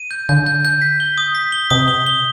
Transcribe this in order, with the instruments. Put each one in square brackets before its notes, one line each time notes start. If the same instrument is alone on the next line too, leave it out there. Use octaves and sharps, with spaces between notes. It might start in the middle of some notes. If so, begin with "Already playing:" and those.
Already playing: [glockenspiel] D#7
G6
[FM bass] D3 [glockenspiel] G6
[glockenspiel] G6
G6
B6
G7
D#6
B6
G7
[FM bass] C3 [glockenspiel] D#6
[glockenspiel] G7
G7